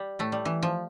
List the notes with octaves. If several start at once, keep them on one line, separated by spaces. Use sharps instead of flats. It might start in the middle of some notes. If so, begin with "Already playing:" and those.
Already playing: G3
A2 A3
G3
E3
F3